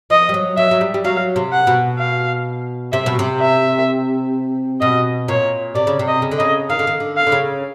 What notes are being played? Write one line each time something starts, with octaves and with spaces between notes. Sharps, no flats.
F3 D#5
G3
F#3
F#3 E5
F#3
G3
G3
F#3 F5
C3
F#5
B2
F5
C3 E5
B2
C3
E5
B2 D#5
A#2 C#5
C3 D5
C#3
C3
D#5
C#3
D3
C#3 D#5
D#3 F5
D3
D#3
D3
F5
D3
C#3